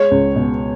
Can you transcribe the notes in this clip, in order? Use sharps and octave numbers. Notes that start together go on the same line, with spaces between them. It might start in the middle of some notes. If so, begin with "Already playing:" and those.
Already playing: G#3 C#5
C#2
B2